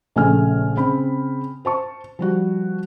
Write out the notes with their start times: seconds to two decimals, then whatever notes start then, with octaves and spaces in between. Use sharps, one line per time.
0.16 A#1 C#3 A3 G#5 F6
0.77 C#3 C4 B5
1.65 C5 A5 C#6
2.19 F3 G3 F#4